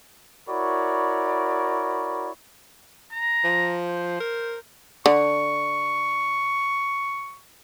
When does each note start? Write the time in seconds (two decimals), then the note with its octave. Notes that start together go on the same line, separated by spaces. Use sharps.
0.49 E4 F#4 A#4 C#5 D5 B5
3.12 A#5
3.44 F3
3.88 C5
4.20 A#4
5.06 D3 C#6